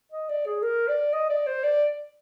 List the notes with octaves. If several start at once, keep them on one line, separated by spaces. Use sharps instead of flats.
D#5
D5
G#4
A#4
D5
D#5
D5
C5
D5